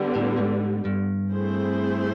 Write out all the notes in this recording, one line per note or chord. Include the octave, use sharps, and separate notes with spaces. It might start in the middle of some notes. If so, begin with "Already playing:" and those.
Already playing: D3 G3 B3
A2
G#2
G2
A3 C4 E4 G#4 C5